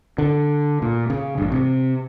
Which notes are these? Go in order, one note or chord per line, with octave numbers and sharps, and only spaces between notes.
D3
A#2
C#3
A1 G2
C3